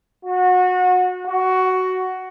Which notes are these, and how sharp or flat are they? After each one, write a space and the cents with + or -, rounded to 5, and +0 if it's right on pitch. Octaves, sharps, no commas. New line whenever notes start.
F#4 -25
F#4 +10